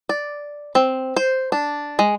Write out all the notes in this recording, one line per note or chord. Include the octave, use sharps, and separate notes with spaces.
D5
C4
C5
D4
G#3